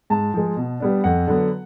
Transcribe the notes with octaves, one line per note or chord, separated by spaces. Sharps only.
G#2 A5
F3 G#3
B2
G3 B3 D4
F2 F#5
D3 F#3 B3